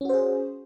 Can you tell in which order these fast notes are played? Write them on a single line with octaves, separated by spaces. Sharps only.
C#4 F#4 C5 G#4